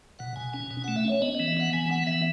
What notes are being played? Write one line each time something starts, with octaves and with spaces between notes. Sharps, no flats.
B2 F#5
B2 G#5
C#4 G#5
B2 G#5
A3 F#5
E5
C#4 C#5
B3 D#5
D#5
E3
E5
B3 F#5
E3 G#5
B3 F#5
E3 E5